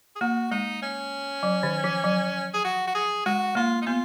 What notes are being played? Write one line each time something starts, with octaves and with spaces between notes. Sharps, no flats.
G#4
A#3 F#4
G#3 D#4
C#4
F#3
D#3
F3
F#3
G#4
F#4
F#4
G#4
G#3 F#4
A#3 F4
D#4
B3 F4